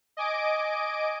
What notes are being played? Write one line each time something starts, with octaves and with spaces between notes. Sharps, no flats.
D#5 G#5 D6 D7